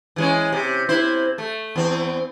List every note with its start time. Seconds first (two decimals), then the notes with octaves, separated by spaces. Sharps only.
0.16 E3 G#3 C#4
0.52 C3
0.89 C3 E4 C5
1.38 A3
1.76 E2 C4